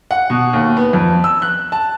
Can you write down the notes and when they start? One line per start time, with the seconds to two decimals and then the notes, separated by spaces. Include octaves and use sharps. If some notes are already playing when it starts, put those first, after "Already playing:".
0.11 F#5
0.30 B2
0.53 D#2
0.77 B3
0.93 F2
1.24 E6
1.42 F#6
1.72 A5